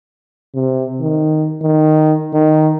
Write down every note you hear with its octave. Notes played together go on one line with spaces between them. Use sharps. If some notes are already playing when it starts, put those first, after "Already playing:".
C3
D#3
D#3
D#3